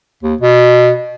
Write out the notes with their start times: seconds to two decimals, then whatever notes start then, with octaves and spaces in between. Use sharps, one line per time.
0.23 D#2
0.41 B2